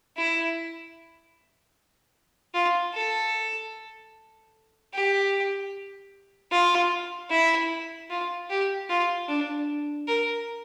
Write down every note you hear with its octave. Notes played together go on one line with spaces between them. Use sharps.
E4
F4
A4
G4
F4
E4
F4
G4
F4
D4
A#4